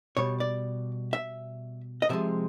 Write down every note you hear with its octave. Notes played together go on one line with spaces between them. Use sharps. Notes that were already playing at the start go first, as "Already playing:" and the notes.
B2 G3 C#5
D5
E5
D#5
C3 F3 G#3 E5